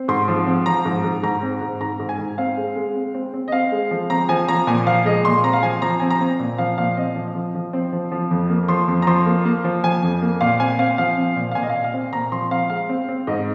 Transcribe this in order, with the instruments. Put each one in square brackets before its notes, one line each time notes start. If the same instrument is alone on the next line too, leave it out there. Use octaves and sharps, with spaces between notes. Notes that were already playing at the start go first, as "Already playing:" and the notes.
Already playing: [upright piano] C4
G#2 C6
F3
C4
F3 A#5
G#2
G#2
G#2 A#5
C4
G#2
G#2 A#5
G#2
G#5
G#2
C4 F5
G#3
G#3
C4
C4
C4
D#5
C4 F5
G#3
F3
C4 A#5
F3 G#5
F3 A#5
A#2 G#5
F3 F5
G#3 D#5
A#2 C6
C4 A#5
F5
F3 G#5
F3 A#5
C4 G#5
A#5
C4
A#2
F3 F5
A#2 F5
C4 D#5
F3
F3
F3
C4
F3
F3
F2
A#3
F3 C6
F2
A#5
F3 C6
A#3
A#3
F3
F3 G#5
F2
A#3
A#2 F5
C4 G#5
C4 F5
F3 F5
C4
A#2
F5
A#2 G#5
D#5
F5
A#2
F5
C4
A#2 A#5
F3 C6
C4 F5
G#3 F5
C4
C4
G#2 D#5